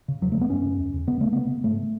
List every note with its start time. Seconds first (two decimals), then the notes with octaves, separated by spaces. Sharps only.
0.08 C#3
0.21 E2 F#3
0.32 A3
0.36 C#3
0.41 B3
0.50 F#2 C#4
0.65 C#3
0.80 E2
0.94 E2
1.07 C#3 B3
1.21 C#3 A3
1.33 C#3 B3
1.50 C#3
1.64 G#2 A3